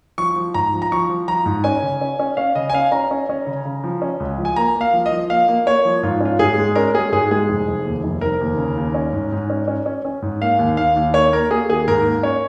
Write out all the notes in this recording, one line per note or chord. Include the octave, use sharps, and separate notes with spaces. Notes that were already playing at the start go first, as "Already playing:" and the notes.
F3 C#6
F3
G#2 A#5
F3
A#5
F3 C#6
F3
F3 A#5
G#2
C#4 G#5
C#3
C#4
C#4
C#4 F5
C#3 D#5
G#5
C#4 F5
C#4 A#5
C#4
C#4
C#3
C#3
F3
C#4
C#2
F3
G#5
A#3 A#5
A#3
F5
F3
D#5
F3
A#3 F5
A#3
A#3 C#5
F3
G#2 F4
C#4 F4
G#2 G#4
G#3
C#4 A#4
G#3 G#4
G#2 G#4
G#3 G#4
F1
F1
D#2
F1
F1 A#4
D#2
C#3
D#2
C#4
G#2
G#2
C#4
C#4
C#4
C#4
G#2
A#3 F5
D#2
D#2 F5
D#2
A#3 C#5
A#3 A#4
A#3 G#4
D#2 G#4
G#2 A#4
A#3
C#4 C#5